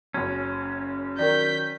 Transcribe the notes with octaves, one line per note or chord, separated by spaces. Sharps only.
F#1 F#2 C#4
D#3 F#3 A#4 D5 G6 B6